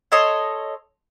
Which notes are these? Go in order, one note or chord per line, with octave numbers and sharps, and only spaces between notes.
A4 C#5 D#5 C6